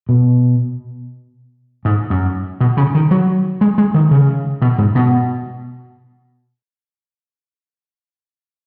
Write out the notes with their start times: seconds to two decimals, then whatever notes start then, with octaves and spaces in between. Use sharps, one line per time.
0.09 B2
1.85 G#2
2.10 F#2
2.60 B2
2.77 C#3
2.95 D#3
3.11 F#3
3.61 G#3
3.78 G#3
3.94 D#3
4.11 C#3
4.62 B2
4.78 G#2
4.95 B2